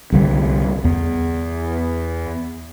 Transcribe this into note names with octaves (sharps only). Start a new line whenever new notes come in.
C2 D3 F3 G3
E2